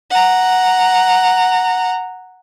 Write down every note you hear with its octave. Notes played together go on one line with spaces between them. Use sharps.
F#5 A#5